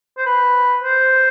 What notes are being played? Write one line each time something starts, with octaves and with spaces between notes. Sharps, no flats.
C5
B4
C5